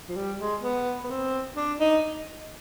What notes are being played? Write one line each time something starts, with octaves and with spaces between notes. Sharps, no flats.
F3
G3
G#3
B3
B3
C4
D4
D#4